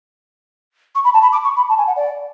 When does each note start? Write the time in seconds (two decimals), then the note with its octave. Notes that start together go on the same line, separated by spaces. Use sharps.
0.95 C#6
1.04 B5
1.13 A5
1.22 B5
1.32 D6
1.44 C#6
1.56 B5
1.69 A5
1.78 G#5
1.87 F#5
1.96 D5